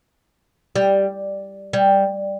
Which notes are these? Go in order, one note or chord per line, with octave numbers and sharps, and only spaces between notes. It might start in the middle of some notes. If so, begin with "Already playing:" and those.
G3
G3